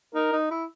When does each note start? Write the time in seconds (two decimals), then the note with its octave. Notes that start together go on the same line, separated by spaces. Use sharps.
0.14 D#4 A#4
0.33 D#4
0.51 E4